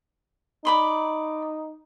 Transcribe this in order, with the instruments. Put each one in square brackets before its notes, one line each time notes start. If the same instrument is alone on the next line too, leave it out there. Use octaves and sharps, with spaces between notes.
[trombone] D#4 [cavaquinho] D5 B5 C6